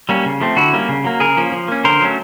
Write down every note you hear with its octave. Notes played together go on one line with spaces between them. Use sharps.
G3 A#3 C#4
C#3
F3 A3 C4
D3 E4 F#4
G3 A#3 C#4
C#3
F#3 A#3
C#3 G#4 A#4
F3 A#3 C#4
F3
A#3 C#4
D3 A#4 C5
F#3 A3 C#4